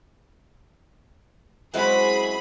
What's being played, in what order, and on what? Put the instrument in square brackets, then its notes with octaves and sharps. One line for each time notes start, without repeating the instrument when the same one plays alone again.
[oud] F#3 G#3 E4 [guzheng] C4 C#4 F5 [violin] G#4 B5